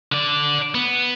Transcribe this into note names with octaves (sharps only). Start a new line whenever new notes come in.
D3 D5
B3